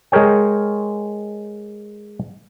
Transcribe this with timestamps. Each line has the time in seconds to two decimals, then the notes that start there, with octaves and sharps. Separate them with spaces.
0.12 G#3 G#4 A#4 C#5 G5